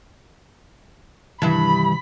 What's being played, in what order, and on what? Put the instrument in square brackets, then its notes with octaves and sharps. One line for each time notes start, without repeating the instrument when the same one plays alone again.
[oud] G2 E4 [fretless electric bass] C3 D#3 E3 [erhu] B5